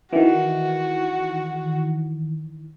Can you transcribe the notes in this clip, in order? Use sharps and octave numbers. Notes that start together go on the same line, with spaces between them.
D#3 E3 F#4